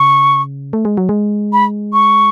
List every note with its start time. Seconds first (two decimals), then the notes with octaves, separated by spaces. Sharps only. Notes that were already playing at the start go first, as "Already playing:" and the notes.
Already playing: C#3 C#6
0.73 A3
0.85 G#3
0.97 F#3
1.09 G#3
1.53 B5
1.93 C#6